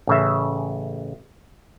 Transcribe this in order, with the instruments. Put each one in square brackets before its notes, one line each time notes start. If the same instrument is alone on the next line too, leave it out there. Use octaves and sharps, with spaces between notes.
[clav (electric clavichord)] A1 C#3 E5